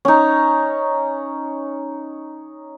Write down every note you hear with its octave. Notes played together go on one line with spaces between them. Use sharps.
C#4 D#4